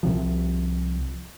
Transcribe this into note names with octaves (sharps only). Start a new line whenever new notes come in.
C2 C3 F3